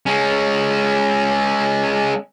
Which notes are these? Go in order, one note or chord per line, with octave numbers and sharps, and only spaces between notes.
G#3 C#4